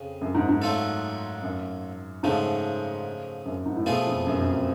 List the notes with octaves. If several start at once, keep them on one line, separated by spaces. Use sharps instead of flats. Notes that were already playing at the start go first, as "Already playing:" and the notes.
Already playing: F2 C#3
F#2
G#2
G#2
F#3 A3 F4 A4
F#2
G#2 C#3 F3 A3
F#2
G#2
A2
B2 F3 A3 F4 G#4
F2
F#2
F#2